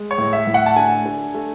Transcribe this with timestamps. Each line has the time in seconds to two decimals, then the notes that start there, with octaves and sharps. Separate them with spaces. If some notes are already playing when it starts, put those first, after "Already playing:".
Already playing: G#3
0.11 C#5
0.18 A2
0.33 E5
0.47 A2
0.54 F#5
0.66 A5
0.76 D3 G#5
1.05 D3
1.34 A3